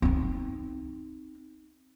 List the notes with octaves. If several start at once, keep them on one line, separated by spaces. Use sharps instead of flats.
C4 D#4